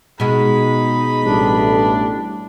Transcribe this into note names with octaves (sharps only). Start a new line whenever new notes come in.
B2 G#3 D#4 B5
A1 G3 A3 D4